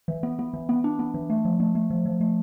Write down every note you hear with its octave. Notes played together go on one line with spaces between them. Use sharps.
E3
B3
B3
E3
B3
D4
B3
E3
A3
F3
A3
A3
F3
F3
A3